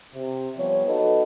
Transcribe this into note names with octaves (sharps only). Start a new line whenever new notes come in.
C3
F3 G3 B3 C#5
B3 D#4 F#4 A4 B4 D#5